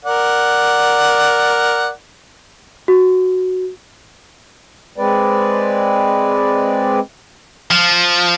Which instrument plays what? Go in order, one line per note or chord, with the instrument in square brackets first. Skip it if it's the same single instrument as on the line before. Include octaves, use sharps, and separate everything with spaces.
[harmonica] A#4 D5 F#5
[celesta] F#4
[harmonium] G#3 C4 B4 D5
[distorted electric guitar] F3